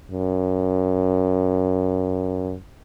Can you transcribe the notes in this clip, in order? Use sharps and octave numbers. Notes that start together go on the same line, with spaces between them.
F#2